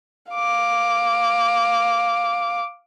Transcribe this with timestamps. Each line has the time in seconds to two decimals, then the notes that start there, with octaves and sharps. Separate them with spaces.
0.32 F5 D6